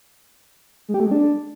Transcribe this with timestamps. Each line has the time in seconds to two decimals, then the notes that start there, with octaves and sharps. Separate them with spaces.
0.89 G#3
0.94 G4
1.00 A3
1.06 G#3
1.11 D4